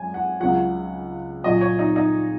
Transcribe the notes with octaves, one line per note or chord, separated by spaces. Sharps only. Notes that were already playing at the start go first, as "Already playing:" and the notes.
Already playing: F#2 G#3 G#5
F#5
C#2 C#3 F#3 F#5
A#2 F#3 D#5
C#5
D#4
D#4